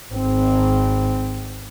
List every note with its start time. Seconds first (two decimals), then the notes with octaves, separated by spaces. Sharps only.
0.13 G#1 C4